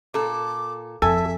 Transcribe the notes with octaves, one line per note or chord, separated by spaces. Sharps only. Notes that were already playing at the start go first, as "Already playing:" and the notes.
A#2 A4 D6
F2 A4 E5 G#5